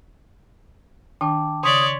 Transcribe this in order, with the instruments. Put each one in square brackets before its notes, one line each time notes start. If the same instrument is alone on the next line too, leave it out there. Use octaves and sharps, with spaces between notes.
[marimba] D#3 D4 [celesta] G5 A5 D6
[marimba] C#3 [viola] C#5 D5 [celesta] C6 B6 [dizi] D#6